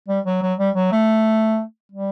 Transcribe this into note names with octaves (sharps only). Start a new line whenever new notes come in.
G3
F#3
F#3
G3
F#3
A3
G3